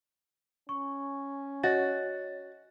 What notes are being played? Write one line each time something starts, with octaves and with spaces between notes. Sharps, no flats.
C#4 C#6
F#4 C#5 D#5 A6